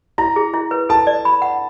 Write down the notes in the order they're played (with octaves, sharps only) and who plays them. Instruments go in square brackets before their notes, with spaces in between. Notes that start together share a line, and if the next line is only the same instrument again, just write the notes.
[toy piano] E4 [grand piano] A#5
[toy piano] G#4
E4
B4
[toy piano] A4 [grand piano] A5
[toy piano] D5
B5
F#5